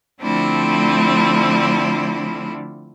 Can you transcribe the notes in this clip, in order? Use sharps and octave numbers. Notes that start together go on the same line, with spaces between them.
D3 F3 A3 C4 D4 E4